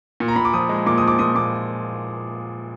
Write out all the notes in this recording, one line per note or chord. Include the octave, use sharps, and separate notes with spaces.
A#2
A#5
A#2 B5
D6
F3 D#6
G#3
A#2 D6
F3 D#6
D6
A#2 D#6
A#2 D6